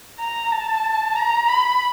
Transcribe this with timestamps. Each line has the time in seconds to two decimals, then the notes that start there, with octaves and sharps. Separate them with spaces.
0.20 A#5
0.51 A5
1.15 A#5
1.48 B5